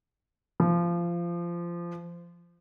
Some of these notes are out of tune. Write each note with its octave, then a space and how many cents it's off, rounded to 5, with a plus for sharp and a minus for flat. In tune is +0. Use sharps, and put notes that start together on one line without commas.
F3 -20